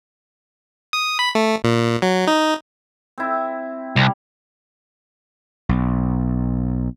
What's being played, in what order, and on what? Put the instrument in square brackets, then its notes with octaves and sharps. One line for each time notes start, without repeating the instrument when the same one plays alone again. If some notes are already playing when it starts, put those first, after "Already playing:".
[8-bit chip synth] D#6
B5
A3
A#2
F#3
D#4
[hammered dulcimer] C4 E4
[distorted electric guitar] C2 [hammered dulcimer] G3
[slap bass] B1